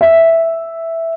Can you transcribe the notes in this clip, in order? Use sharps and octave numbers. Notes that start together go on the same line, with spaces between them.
E5